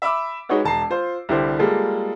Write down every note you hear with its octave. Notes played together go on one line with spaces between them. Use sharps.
E5 B5 D6 E6
G#3 D#4 F#4 B4 C#5 F#5
E1 A5 A#5 C7
F4 C5
C2 D3 E4 G4 C5
G3 G#3 A#3 F4 G#4 A4